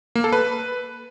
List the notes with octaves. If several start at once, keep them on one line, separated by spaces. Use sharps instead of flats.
A#3
A4
B4